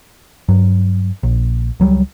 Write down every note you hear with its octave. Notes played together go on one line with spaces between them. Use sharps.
G2 F#3
A#1
C#2 F#3 G3